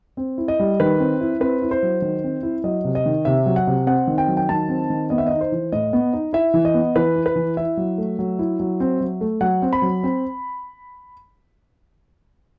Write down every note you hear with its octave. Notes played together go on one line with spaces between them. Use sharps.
C4
E4
D#5
G3
D#3 B4
C4
E4
C4 B4
E4
C5
F#3
D#3
C4
E4
F#3 D#5
C3
D#5
D#3
C3 E5
F#3
F#5
C3
C4 F#5
D#3
G5
F#3
G5
D#3 A5
C4
D#3
B3 D#5
E5
D#4 D#5
C5
E3
A2 D#5
B3
D#4
E4 E5
E3
D#5
B3
E3 B4
E4
B4
E3
E4 E5
F#3
A3
F#3
E4
F#3
C4
F#3
A3
F#3 F#5
C4
B5
F#3
C4